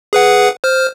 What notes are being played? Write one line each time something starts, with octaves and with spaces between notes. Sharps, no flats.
G#4 B4 F#5
C5 F6